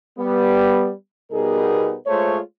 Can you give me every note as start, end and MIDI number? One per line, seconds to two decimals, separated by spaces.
0.19 0.90 55
0.19 0.90 59
1.32 1.95 47
1.32 1.95 55
1.32 1.95 59
1.32 1.95 63
1.32 1.95 68
1.32 1.95 70
2.07 2.38 56
2.07 2.38 57
2.07 2.38 65
2.07 2.38 72
2.07 2.38 73